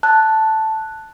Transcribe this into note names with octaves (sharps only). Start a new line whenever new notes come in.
A5 F#6